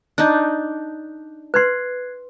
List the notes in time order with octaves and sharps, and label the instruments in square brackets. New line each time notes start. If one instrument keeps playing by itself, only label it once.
[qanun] D4 D#4 [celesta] F#6 G6
[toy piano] B4 C6 [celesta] F#6 G#6 C7